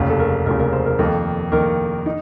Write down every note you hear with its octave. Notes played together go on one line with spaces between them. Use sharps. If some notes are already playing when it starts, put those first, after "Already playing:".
Already playing: F1 D#2 C#3
A4
A#4
F1 D#2 C#3 A#4
A#4
C5
A#4
F2 D#3 A#3 A4
F2 D#3 A#3 A#4
D#4